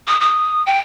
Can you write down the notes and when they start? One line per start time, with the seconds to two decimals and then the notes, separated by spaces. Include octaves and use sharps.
0.07 D#6
0.20 D#6
0.66 G5